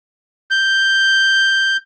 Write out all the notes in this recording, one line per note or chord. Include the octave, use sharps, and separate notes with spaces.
G6